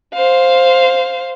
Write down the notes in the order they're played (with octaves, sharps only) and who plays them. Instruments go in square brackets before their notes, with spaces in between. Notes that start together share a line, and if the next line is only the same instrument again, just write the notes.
[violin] C5 F5